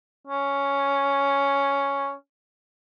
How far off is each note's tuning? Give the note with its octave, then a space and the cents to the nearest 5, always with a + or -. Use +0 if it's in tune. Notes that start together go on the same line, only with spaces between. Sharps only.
C#4 +5